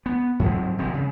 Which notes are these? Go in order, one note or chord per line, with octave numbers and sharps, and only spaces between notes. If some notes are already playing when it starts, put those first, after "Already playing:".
B3
G#2 F3 F#3 C4
F#1 B2 G#3 C4
C#3